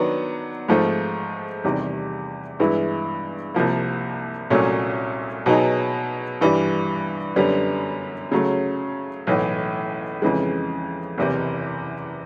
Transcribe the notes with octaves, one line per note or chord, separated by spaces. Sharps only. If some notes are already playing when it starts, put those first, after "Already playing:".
Already playing: D#3 F#3 B3 D4
G#2 F3 A3 C4
E2 C3 D#3 G3
G2 E3 G#3 B3 E4
C2 C3 F3 A#3
C2 A#2 F#3 A3 C#4
B2 F#3 B3 D#4 G#4
G2 E3 G3
F#2 D3 G3 B3
C#3 F#3 A3
B1 A2 E3
F2 C#3 E3 G#3
F#1 E2 C3 E3